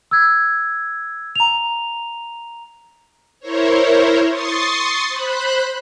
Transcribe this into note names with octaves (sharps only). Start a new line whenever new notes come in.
E6 G#6
A#5 F7
E4 A#4 C5 C#5
C6 C#6 D#6 A6 C7
C5 B5 F#6